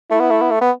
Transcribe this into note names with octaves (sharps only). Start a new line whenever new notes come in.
A3 E4
B3
A3
B3
A3
B3